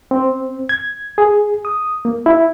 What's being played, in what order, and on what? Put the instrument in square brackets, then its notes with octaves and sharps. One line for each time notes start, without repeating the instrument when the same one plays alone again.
[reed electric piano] C4
G#6
G#4
D#6
A#3
E4